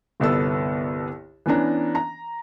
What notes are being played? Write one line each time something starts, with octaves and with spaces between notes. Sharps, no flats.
G1 C2 B3 A4 E6
E3 B3 C#4 D4 A#5
A#5